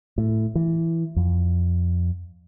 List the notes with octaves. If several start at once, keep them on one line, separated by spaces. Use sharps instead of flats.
A2
E3
F2